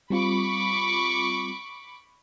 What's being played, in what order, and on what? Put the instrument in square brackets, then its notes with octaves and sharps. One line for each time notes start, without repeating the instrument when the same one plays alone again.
[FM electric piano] G3 C4 F4 [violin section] B5 C#6 D6